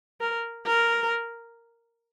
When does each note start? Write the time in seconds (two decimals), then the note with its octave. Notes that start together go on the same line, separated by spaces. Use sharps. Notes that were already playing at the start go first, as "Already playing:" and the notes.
0.20 A#4
0.66 A#4